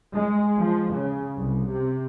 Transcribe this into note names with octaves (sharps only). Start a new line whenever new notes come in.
G#3
F3
C#3
C2
C3